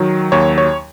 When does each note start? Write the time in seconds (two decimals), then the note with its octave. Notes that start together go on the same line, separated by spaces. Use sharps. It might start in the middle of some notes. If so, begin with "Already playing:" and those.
Already playing: D#3 F#3
0.32 D#2 C#5
0.58 C#5